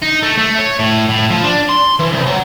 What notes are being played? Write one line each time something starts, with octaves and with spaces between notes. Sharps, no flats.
D#4
A3
A3
C#5
A2
A2
F3
D4
C6
E3
C2
F#3